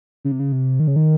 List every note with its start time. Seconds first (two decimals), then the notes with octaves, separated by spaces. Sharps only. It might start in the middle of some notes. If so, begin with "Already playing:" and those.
0.25 C#3
0.32 C3
0.39 C#3
0.52 C3
0.80 D#3
0.88 C#3
0.96 D#3